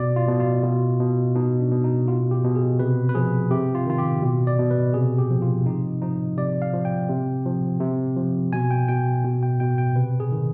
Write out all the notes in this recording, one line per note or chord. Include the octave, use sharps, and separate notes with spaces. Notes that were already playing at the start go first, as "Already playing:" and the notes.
Already playing: B2 D5
F4
B2
F4
B2
B2
B2 D#4
D4
B2
D#4
B2 F4
G4
B2
G#4
C3 B4
B4
F3 G#4
C3 G4
F4
D#3 F4
G4
B2
D5
B2
B4
C3 G#4
G4
F3
F4
C3 D#4
F3 D#4
C3 D5
F5
F3
G5
C3
F3
C3
F3
B2 G#5
G5
B2 G5
B2
G5
B2 G5
G5
C3 B4
G#4
D#3